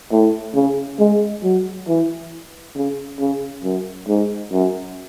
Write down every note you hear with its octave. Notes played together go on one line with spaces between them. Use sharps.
A2
C#3
G#3
F#3
E3
C#3
C#3
F#2
G#2
F#2